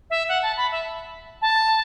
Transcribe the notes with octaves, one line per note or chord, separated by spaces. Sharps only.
E5
F#5
A5
B5
E5
A5